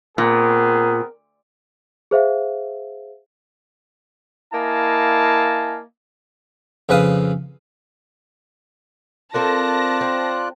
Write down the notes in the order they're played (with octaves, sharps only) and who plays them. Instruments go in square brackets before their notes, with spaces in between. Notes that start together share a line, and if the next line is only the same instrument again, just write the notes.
[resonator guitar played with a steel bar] A#2 [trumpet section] B3 C4 G#4 [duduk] A#4
[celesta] G#4 C5 E5 F5
[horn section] A#3 E4 D#5 F5 G#5 A5
[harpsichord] F2 C#3 B4 F5 D#6
[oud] C4 A4 A#4 [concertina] F4 D5 F#6 [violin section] A5 A#6
[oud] C4